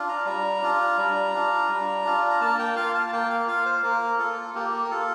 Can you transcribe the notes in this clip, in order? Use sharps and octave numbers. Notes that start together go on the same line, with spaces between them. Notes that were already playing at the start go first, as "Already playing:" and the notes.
Already playing: D4 F4
A#5
G3 A#5
D4 F4
G3
D4 F4
G3
D4 F4
A#5
A#3 A5
G5
F4 F5
A5
A#3 G5
F5
F4 F5
C5
A#3 A#4
F4 A4
A#3 G4
A#4
F4 A4